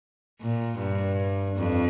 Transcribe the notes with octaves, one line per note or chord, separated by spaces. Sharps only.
A#2
G2
F2